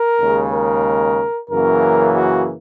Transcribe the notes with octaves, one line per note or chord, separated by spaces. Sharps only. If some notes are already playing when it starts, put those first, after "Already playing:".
Already playing: A#4
D#2 C#3 G#3
A#4
F#2 C#3 E3 A#3 A#4
F#4